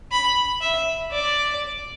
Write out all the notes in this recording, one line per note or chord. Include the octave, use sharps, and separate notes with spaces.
B5
E5
D5